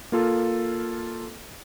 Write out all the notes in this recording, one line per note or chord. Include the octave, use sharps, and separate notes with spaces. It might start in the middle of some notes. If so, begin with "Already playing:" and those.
A#3 F4 A4